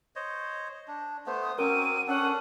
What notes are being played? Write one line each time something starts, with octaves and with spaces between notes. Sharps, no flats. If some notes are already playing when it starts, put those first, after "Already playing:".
C5 C#5 D#5
D4
A3 B3 C5
D#6
F#3 C4 C#4 A#4 D6 D#7
C#4 D4 A4 F#5